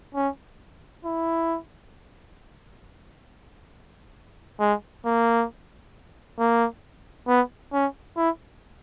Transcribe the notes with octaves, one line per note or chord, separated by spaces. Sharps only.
C#4
E4
G#3
A#3
A#3
B3
C#4
E4